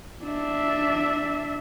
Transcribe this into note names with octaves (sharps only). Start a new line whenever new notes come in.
D4 E5